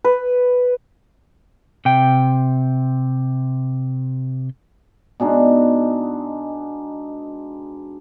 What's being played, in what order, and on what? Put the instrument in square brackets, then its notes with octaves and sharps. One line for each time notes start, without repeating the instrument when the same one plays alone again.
[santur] B4
[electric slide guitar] C3 G5
[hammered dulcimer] B2 G#3 D4 D#4